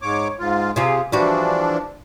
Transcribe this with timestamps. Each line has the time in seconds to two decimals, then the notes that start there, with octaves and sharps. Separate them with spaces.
0.02 G#2 C#5 D6
0.39 G#2 F4
0.76 C3 F4 G#4
1.12 E3 F3 G3 D4 F#4